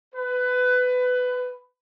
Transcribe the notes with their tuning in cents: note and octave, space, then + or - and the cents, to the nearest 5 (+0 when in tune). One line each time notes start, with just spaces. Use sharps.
B4 +20